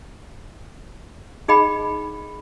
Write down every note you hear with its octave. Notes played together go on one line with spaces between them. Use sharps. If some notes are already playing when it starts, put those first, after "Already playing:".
D#4 G#4 D#5 G5 B5